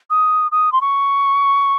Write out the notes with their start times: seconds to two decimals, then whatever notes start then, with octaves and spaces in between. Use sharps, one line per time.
0.10 D#6
0.52 D#6
0.72 C6
0.81 C#6